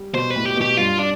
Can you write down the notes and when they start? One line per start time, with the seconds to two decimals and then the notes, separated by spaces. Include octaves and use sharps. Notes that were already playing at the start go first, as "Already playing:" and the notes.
Already playing: G3
0.14 B2 C5
0.30 B4
0.36 A2
0.45 G4
0.56 B2
0.61 G4
0.77 G2 F4
0.98 D4